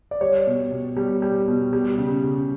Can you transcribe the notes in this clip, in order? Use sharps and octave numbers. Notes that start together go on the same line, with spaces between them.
D5
G3 C#5
B2
B2
G3
G3
B2
G3
C#3
C#3